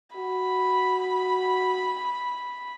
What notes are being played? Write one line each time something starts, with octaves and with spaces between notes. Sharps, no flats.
F#4 B5